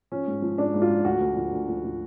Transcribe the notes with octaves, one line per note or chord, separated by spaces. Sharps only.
F3 C#4
G#2
F3
G#2 D4
G#2
F4
F3
D2 F#4
D2
F3
D2
F3
F3